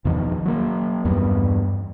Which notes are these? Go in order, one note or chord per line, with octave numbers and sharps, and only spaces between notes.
E2 B2 D#3 F3
F#3 A#3
E2 G2 G3 B3